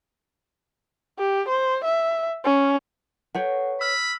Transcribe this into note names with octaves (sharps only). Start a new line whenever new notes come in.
G4
C5
E5
C#4
A4 B4 C#5 F#5 G5
B5 E6 F6